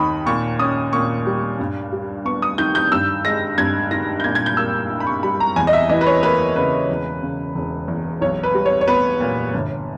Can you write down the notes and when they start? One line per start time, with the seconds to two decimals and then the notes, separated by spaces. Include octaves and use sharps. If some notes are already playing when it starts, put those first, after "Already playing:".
Already playing: D#2 D#3 B5 C#6 D#6
0.26 A#2 C#6
0.59 C#4 D#6
0.93 A#2 C#6
1.26 G3
1.59 G2
1.92 G3
2.25 B3 C#6
2.42 D#6
2.58 D#3 G6
2.75 G6
2.92 G2 E6
3.25 G#3 A#6
3.58 G2 G#6
3.91 D#3 A#6
4.20 G6
4.24 A#2 G#6
4.35 G#6
4.46 G6
4.57 A#3 E6
4.90 E4
5.00 B5
5.07 C#6
5.23 G3 B5
5.40 A#5
5.56 E2 G#5
5.67 D#5
5.73 E5
5.89 E3 D#5
6.01 B4
6.06 C#5
6.23 A#3 B4
6.56 C#3 B4
6.89 E1
7.22 C#3
7.55 E1
7.88 E2
8.21 B1 C#5
8.43 B4
8.54 G3
8.66 C#5
8.81 C#5
8.88 B3 B4
9.20 A#2
9.54 G1